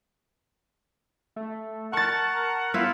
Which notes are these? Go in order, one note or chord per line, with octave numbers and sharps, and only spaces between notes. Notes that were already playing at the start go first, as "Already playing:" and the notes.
A3
A#4 F#5 A5 C#6 A6
B3 E4 F4